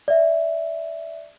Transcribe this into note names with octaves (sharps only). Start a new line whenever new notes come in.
D5 E5